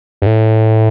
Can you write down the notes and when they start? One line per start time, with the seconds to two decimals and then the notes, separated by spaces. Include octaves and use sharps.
0.22 G2
0.26 A2